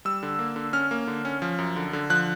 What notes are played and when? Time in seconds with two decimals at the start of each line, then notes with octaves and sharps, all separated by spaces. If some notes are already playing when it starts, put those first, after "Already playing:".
0.05 G3 E6
0.23 D3
0.39 A#3
0.56 D3
0.73 C#4 F6
0.91 A#3
1.07 D3
1.25 C#4
1.42 F3
1.58 F#2
1.76 D3
1.93 D3
2.10 F3 F#6